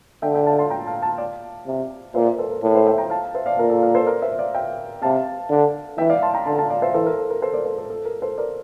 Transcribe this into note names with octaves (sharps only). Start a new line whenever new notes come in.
D3 E5 G5
E5 G5
F5 A5
A5 C6
G5 A#5
F5 A5
F5 A5
D5 F5
C3
A#2 C5 E5
A#4 D5
A4 C5
A#4
A2 A#4
A4 C5
E5 G5
G5 A#5
F5 A5
C5 E5
D5 F5
A#2 A#4
A4
A#4
A4 C5
A#4 D5
C5 E5
D5 F5
E5 G5
C3 F5 A5
D3
E3 E5 G5
D5 F5
A5 C6
G5 A#5
D3 A5 C6
F5 A5
D5 F5
C5 E5
E3 A4 C5
A#4
A4
A#4
A4 C5
A#4 D5
A4 C5
A4
A4
A#4
A4 C5
A#4 D5